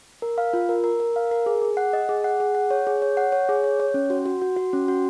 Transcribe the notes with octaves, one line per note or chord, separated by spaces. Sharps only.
A#4
F5
F4
A#4
A#4
A#4
F5
A#4
G#4
G#4
F#5
D#5
G#4
F#5
G#4
F#5
C#5
G#4
C#5
F#5
C#5
G#4
C#5
C#5
C#4
F#4
F#4
F#4
F#4
C#4
F#4